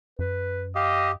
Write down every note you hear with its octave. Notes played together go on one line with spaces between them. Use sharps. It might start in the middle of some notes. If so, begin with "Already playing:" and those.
F#2 B4
G4 D#5 F5